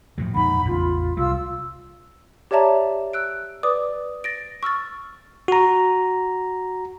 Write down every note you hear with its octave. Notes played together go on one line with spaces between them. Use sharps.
A2 F3 F#3
F2 A#2 G#3 D#4 F#5 B5
A1 E2 C#3 F4
C2 G3 F4 F5 E6
G4 C#5 D5 E5 A5 A#5
E6 F#6 D7
B4 D5 D6 D#6
A6 A#6 D7
C#6 E6 F6 A6
F#4 A#5